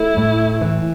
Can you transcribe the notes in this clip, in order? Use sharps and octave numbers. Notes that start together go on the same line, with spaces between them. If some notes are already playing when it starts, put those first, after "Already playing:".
Already playing: A3 E4
A2
E3